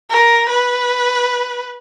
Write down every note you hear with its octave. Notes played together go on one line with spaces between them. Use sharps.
A#4
B4